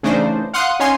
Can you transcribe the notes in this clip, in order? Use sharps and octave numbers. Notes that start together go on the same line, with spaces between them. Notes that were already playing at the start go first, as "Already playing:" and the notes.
C#3 E3 A3 D4 D#4 C5
F5 F#5 C6 D#6 F#6
C#4 D#4 C#5 F5 G#5 C6